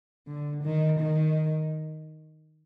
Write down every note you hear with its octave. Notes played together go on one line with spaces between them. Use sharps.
D3
D#3
D#3